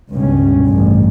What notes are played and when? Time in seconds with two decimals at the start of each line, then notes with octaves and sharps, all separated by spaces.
0.11 C#2 G2 B2 G3 C#4
0.65 A1 G2